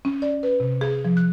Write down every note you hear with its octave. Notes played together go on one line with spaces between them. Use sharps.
C#4
D5
B4
C3
G#4
F3
F#6